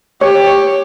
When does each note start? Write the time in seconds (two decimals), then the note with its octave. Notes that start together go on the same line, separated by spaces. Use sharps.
0.21 G4 C#5
0.46 C#5